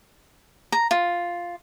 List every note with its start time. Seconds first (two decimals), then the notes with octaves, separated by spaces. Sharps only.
0.72 A#5
0.91 F4